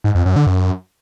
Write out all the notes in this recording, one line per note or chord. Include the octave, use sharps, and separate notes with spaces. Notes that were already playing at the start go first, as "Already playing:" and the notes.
G#2
F2
F#2
D3
F#2